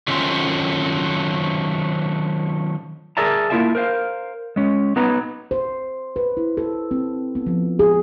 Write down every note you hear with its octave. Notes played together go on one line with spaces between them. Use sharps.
D#3 F#3 A3 C4 C#4 F4
G#4 A#4 D5 E5 A5 A#5
A#3 C4 E4 F4 E5 A5
A#4 C5 F5
G#3 C#4
F#3 B3 D#4 B4 A#5
C5
B4
E4
A4
C4
B3
F3
G#4